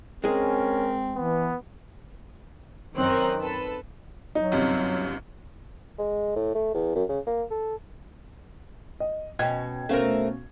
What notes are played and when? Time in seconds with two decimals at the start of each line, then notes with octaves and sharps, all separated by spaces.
0.24 G#3 C4 C#4 G#4 A#4
1.16 E3 B3
2.96 F#2 D#3 C4 D#4 A#4 F#6
3.41 A4 B4
4.35 F#3 D#4
4.52 G1 F#2 C3
5.99 G#3
6.36 A2
6.55 A3
6.74 E2
6.95 F#2
7.09 C#3
7.27 A#3
7.51 A4
9.00 D#5
9.39 B2 C#4 D#5 G5 G#6
9.89 B2 A3 C4 C#4 A#4 F5